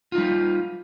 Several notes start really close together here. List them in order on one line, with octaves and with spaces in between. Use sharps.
F4 D#4 G3